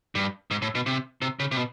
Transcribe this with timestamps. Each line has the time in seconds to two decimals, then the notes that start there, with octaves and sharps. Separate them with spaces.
0.15 G2
0.51 G#2
0.62 A2
0.75 B2
0.86 C3
1.22 C3
1.40 C#3
1.51 C3
1.57 B2